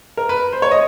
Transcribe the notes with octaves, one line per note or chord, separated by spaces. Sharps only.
A#4
B4
C5
C#5
D#5